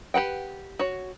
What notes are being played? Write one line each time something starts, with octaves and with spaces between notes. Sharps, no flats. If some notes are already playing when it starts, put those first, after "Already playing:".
G4 B4 F#5 G5
F#4 C#5